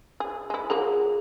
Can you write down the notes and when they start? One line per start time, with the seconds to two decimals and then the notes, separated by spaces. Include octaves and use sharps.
0.20 G#4
0.50 G#3 E4
0.70 F3 F#3 A#3 G#4